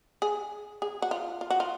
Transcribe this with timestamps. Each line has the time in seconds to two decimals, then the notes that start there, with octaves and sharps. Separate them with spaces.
0.22 G#4
0.82 G#4
1.02 F#4
1.11 F4
1.41 F4
1.50 F#4
1.60 F4